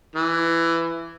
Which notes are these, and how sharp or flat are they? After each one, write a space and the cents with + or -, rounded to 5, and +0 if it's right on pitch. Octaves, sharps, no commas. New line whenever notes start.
E3 +15